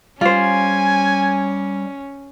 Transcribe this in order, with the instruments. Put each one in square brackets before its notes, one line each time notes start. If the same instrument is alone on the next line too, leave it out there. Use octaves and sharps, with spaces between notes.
[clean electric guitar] G3 [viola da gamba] C#4 [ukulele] F4 C5 [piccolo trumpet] G#5